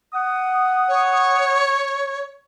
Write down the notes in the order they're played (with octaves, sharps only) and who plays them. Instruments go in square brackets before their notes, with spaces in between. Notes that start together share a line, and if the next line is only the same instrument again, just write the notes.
[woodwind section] F#5 D#6
[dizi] C#5